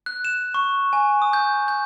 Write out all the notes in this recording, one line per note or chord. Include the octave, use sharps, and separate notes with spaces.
F#6
E7
C#6
G#5
D#6
G6
G6